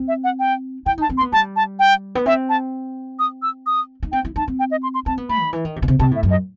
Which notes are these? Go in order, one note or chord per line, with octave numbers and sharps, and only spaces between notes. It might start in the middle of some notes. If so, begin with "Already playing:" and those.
Already playing: C4
E5
F#5
G5
E4 G5
D#4 A5
C4
C6
B3
G3 A5
A5
G5
B3
C4 E5
A5
D#6
E6
D#6
D#4
C4 G5
E4
D#4 A5
C4
G5
D#5
C6
C6
C4 A5
B3
A3 B5
D#3
E3
D#3
C3
B2
C3
C3 A5
A2 E5
F#2
D#5